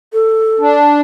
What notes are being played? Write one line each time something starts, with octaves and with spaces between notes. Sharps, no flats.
A4
D4